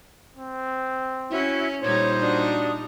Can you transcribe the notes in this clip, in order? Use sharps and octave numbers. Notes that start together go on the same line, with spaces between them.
C4
C#4 E4 F#4
A#2 G3 D#4 C5 C#5 G#6
D4 F#4 D#6